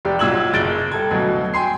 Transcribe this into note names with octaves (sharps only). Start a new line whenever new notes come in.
F1 G4 D5
B1 A#2 E6 G#6 F#7
F#1 A6 D7 G7
G3 A4 G#6
D2 B2 F#3
G5 G#5 C6 C7